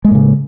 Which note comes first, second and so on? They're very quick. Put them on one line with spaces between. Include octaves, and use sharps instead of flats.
G#3 A#3 A2 C#3